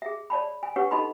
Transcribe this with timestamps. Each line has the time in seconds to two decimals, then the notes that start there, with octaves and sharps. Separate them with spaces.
0.02 G#4 E5
0.30 C#5 D5 A5 B5
0.63 G#5
0.76 D4 G4 B4 C#5 F#5 C#6
0.91 D#4 A4 D#5 A5 B5 C6